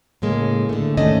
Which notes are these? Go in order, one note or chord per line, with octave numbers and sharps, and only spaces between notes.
A2 C#3 G#3 A#3
D3 A3
G#2 D#3 A3 C#4 D5 D#5